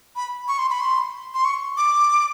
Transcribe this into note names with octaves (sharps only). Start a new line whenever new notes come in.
B5
C#6
C6
B5
C6
C6
C#6
D6